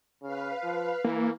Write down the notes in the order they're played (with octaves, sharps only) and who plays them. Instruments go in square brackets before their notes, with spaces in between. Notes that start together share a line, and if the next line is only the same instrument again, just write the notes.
[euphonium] C#3 [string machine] B4 F5
[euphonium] F3
[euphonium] E3 [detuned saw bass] A#3